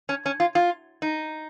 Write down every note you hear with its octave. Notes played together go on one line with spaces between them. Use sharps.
C#4
C#4
F4
F4
D#4